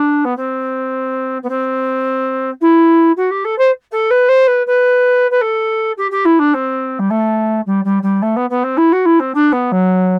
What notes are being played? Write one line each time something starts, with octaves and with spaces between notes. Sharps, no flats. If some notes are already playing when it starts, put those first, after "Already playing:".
Already playing: D4
B3
C4
B3
C4
E4
F#4
G4
A4
C5
A4
B4
C5
B4
B4
B4
A4
G4
G4
E4
D4
C4
G3
A3
G3
G3
G3
A3
B3
B3
C4
E4
F#4
E4
C4
D4
B3
F#3